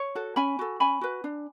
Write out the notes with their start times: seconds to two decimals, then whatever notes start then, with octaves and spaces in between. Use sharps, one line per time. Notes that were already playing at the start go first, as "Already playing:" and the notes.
Already playing: C#5
0.15 F#4 A4
0.36 C#4 G#5 B5
0.59 F#4 A4
0.80 C#4 G#5 B5
1.01 F#4 B4
1.24 D4